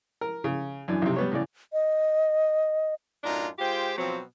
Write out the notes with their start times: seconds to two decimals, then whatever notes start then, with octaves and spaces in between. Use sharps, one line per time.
0.21 A#4
0.44 C#3
0.88 F#2 E3 D4
1.02 B1 C3
1.16 G3 B3 C#5
1.32 A2 C#3 D5
1.73 D#5
3.24 F#2 A2 D4 D#4 F4 A#5
3.59 G#3 F4 G4 C5 G5
3.98 B2 F3 F#3 C4